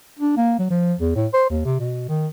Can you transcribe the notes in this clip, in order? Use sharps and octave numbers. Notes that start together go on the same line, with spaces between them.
D4
A#3
F#3
F3
E2
A2
C5
D#2
C3
B2
D#3